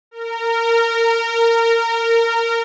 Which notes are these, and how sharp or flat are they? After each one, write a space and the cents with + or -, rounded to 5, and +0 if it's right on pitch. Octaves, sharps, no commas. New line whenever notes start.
A#4 -20